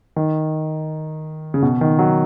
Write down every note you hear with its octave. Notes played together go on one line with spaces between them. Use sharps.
D#3
C#3
B2
D#3
F#3